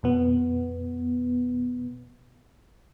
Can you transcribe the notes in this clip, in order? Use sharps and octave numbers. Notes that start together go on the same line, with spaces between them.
F2 B2 B3